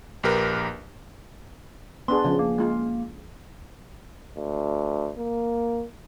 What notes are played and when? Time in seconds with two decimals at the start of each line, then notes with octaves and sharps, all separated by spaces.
0.23 A#1 G4 A#4 B4
2.08 B3 D4 G#4 C6
2.24 C#3 F3
2.39 A#3
2.58 G#3 F4
4.37 D2
5.18 A#3